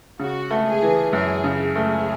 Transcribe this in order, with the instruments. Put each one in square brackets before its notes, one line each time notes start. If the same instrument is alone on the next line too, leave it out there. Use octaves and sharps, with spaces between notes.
[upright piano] C#3 [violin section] F#4
[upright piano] A3
[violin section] G#4
[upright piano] E3
[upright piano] F#2 [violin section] G#4
[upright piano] C#3
[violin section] G#4
[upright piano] A3